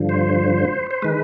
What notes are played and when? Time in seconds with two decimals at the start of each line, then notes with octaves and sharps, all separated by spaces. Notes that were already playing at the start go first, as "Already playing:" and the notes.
Already playing: G2 D3 F3
0.09 C5
0.91 C5
1.02 D#3 G#3 B4